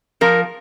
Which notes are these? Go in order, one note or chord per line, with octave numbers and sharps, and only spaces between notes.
F3 A#4